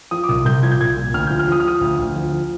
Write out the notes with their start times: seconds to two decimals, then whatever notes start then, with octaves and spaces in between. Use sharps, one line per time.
0.11 F3 D#6
0.24 D6
0.29 C2 D#6
0.45 C2 G6
0.63 F3 G#6
0.72 G6
0.80 C2 G#6
0.97 A#2
1.14 D2 F6
1.27 F3 G6
1.39 F6
1.48 F3 D#6
1.60 F6
1.65 F3 D#6
1.81 D2
1.98 D2
2.16 F3
2.32 F3